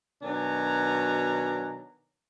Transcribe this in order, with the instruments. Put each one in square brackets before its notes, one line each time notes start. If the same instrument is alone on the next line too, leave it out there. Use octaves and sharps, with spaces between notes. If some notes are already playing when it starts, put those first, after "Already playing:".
[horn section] B2 D#3 F#3 D4 G#5 A#5